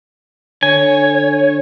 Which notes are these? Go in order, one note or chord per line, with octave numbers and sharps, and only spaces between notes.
D3 C#5 G#5